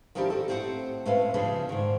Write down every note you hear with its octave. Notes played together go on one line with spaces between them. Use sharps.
D#3 F3 C#4 D4 E4 G4
F#4 A4
A2 C4 C5 D#5 F#5
A2 A3 C4 C#4 B4 F5
C#3 F3 B3 C#4 D4 G#4
G#2 D#3